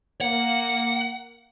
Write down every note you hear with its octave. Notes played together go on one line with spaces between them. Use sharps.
A#3 F#5